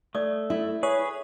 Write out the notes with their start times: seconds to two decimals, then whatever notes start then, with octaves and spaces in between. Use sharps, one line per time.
0.15 A3 D5 D#6
0.50 E4 A4 E5
0.83 G#4 B4 C#5